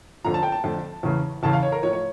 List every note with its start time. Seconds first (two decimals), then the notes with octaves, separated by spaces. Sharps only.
0.25 F2 D3 F3 A#5
0.34 A5
0.43 G5
0.52 A5
0.64 F2 D3 F3
1.03 E2 C#3 E3
1.43 E2 C#3 E3 A5
1.53 F5
1.63 C#5
1.72 A#4
1.83 A2 F3 C#5
1.93 C#5